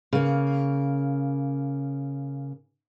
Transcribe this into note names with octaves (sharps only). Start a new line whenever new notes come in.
C#3 A#3